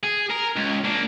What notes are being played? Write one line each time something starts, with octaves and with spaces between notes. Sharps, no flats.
G#4
A#4
C#2
A#3 D4